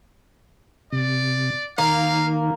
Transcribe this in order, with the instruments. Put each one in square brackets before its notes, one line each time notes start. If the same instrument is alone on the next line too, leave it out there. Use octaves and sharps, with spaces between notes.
[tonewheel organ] C3 [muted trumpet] D5
[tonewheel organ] D#3 [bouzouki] A#3 [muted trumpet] F5